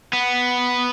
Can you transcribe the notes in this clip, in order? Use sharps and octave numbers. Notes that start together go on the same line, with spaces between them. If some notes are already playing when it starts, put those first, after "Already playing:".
B3